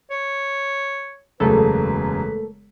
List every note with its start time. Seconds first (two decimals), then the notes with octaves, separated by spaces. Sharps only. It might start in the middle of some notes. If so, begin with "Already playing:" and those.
0.10 C#5
1.40 E1 F#2 C#3 A3 A#3 A4 B4